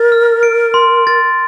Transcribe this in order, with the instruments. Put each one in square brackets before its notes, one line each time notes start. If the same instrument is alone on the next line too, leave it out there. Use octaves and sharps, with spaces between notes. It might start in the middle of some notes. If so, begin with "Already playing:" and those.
Already playing: [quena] A#4 [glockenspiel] A6
[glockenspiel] F6
D7
C6
A6